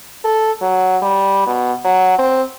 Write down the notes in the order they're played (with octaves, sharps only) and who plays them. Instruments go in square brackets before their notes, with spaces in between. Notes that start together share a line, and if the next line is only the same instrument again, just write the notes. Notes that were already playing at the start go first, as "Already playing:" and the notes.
[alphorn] A4
F#3
G3
B2
F#3
C4